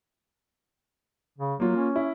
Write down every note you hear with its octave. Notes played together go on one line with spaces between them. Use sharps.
C#3
F#3 A#3 F4
C#4
E4